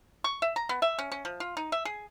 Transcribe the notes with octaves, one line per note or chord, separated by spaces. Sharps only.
C#6
E5
A#5
B3
E5
C#4
C#4
F3
F4
D#4
E5
G#4